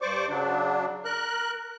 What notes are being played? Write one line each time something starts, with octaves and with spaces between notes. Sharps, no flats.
G2 C5 D5 C#6 D6
C#3 F#3 D4
A#4 F#6